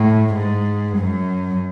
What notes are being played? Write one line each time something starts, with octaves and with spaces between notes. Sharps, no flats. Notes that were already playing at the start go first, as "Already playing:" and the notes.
Already playing: A2
G#2
F#2